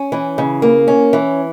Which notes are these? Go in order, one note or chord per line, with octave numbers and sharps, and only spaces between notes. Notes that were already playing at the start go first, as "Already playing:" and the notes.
Already playing: C#4
E3
C#3
A#3
C#4
E3